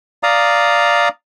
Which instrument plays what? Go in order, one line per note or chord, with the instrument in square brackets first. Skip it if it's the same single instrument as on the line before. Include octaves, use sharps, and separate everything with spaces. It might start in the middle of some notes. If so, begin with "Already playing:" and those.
[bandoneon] D5 F5 A#5 D#6